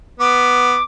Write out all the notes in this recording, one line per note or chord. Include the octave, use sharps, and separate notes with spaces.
B3 D6